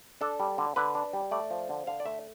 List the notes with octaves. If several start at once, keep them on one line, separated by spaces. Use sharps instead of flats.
D4 A4
G3
D3
D3 B4
D4
G3
A3 D5
F3
D3
D3 F5
D5
A3 E5